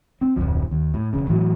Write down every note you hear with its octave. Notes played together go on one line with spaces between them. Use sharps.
C4
D1 G1 F2 F3
D#2
A2
E1 C#3
A2 E3 F#3